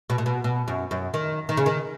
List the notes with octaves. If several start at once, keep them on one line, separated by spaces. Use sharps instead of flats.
B2
A#2
B2
B2
F#2
F#2
D#3
D#3
C#3
D#3